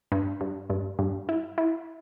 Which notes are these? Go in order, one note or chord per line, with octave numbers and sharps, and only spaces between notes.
G2
G2
G2
G2
E4
E4